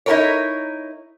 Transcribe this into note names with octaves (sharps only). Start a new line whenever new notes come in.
D#4 E4 F#4 A4 A#4 C#5